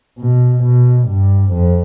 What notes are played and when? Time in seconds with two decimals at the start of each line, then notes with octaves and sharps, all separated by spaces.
0.19 B2
0.63 B2
1.08 G2
1.52 F2